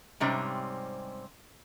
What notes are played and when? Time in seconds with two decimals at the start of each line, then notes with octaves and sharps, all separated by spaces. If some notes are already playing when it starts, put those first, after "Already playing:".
0.20 G#2 C3 G3 C4 C#4